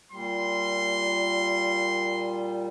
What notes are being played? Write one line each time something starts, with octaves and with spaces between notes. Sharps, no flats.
A#2 G3 C6